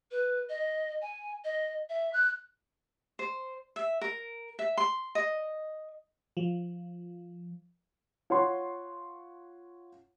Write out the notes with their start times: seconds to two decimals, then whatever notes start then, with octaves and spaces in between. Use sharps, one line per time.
0.11 B4
0.49 D#5
1.02 G#5
1.44 D#5
1.90 E5
2.13 F#6
3.19 C5
3.76 E5
4.01 A#4
4.59 E5
4.77 C6
5.15 D#5
6.37 F3
8.30 F4 C#5 F#5 C6 C#6